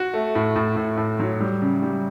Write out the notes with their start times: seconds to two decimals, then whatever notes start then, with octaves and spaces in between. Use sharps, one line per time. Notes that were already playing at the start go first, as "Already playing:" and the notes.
Already playing: F#4
0.13 A3
0.35 A2
0.56 A2
0.76 A2
0.97 A2
1.20 F#3
1.40 G3
1.62 C#3
1.82 G3